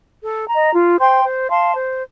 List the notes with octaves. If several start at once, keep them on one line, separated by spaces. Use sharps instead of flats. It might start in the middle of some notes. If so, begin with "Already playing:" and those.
A4
A#5
D#5
F4
C5 G5 C6
C5
F5 A5 C6
C5